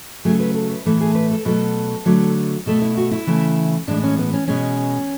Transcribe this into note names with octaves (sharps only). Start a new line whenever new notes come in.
C#3 F#3 A3 G#4
B4
A4
B4
A2 E3 A3 A4
G#4
B4
A4
B2 F#3 A3 A4
D3 F#3 A3
B2 A3 A4
E4
F#4
E4
C#3 E3 A3
A2 E3 G#3 D4
C#4
B3
C#4
B2 G#3 C#4